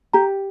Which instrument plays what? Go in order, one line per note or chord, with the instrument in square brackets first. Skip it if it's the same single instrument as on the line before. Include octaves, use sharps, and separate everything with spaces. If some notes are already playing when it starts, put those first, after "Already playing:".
[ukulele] G4 [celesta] A#5